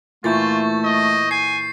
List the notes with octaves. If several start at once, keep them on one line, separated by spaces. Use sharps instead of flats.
A#2 E3 A3 F4 C#6 G6 A6
D#5
G#5 C7